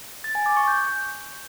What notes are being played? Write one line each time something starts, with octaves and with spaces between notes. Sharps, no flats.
A6
G#5
D6
C#6
G6